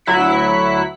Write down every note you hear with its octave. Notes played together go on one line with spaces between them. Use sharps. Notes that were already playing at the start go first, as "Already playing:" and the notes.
D2 F#3 E4 F#6 B6 C#7